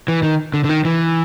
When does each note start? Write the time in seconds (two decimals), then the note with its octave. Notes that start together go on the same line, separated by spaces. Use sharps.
0.08 E3
0.23 D#3
0.54 D3
0.64 D3
0.69 D#3
0.85 E3